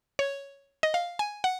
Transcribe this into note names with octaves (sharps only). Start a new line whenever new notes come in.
C#5
D#5
F5
G#5
F#5